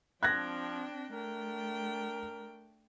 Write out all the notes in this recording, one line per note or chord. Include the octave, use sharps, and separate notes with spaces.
F3 C4 D4 G5 F#6 G#6 A#6
A3 D4 A#4 G5